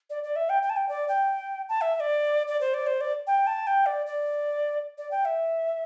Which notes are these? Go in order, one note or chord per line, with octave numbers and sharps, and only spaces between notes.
D5
D5
E5
G5
G5
A5
G5
D5
G5
A5
E5
E5
D5
D5
C5
D5
C5
D5
G5
A5
G5
D5
D5
D5
G5
E5